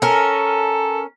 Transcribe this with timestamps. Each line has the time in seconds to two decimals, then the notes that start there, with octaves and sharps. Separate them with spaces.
0.02 C#4 A4 A#4